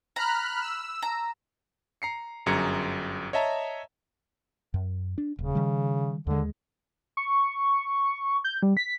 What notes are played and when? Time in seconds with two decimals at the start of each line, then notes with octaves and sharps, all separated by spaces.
0.16 A#5 B5 F6 F#6
0.61 E6
1.02 A#5
2.02 A#5 C7 C#7
2.46 G1 F#2 G#4 A#5 G#6 C#7
3.33 C#5 D#5 E5 A5 A#5
4.74 F#2
5.18 D4
5.39 D#1 C#3
5.55 D#3 G3
6.27 D#2 D3 G#3
7.17 C#6
8.44 G6
8.62 G3
8.77 B6